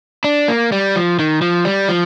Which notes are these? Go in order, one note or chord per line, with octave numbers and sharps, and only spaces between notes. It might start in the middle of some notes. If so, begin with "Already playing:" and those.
D4
A#3
G3
F3
D#3
F3
G3
F3